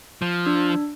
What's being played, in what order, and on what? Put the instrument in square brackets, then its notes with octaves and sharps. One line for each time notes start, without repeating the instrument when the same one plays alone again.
[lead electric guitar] F3
[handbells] D4